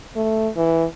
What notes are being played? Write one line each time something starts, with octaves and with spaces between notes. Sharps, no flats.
A3
E3